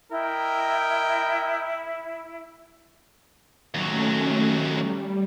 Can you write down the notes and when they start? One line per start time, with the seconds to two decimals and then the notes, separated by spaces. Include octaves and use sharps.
0.12 E4 A#4 D#5 G5
3.74 D#2 F#3 A3 C#4
4.73 G3